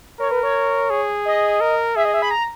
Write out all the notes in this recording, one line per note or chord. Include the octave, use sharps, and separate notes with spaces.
A#4 C#5
B4
C#5
G#4
D#5
A#4
G#4 E5
D#5
E5
B5
A#5